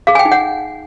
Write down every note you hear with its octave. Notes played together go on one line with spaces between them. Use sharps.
G#4 F5
G#5
G5
D#4
F#5